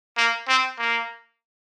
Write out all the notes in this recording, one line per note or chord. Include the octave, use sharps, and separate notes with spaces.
A#3
C4
A#3